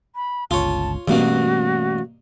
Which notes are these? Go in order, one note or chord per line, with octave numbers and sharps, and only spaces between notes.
B5
G1 C#2 F4 C#5 A5
G2 B2 E3 A3 A#3 C#4 F#4